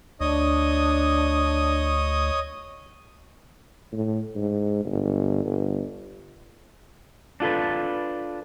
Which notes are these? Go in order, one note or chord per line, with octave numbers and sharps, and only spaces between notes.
D2 D4 C#5 D#5 D#6
A2
G#2
G1
G1
D4 F4 A4 B4